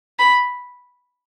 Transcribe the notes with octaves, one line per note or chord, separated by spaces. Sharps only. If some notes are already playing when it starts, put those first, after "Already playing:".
B5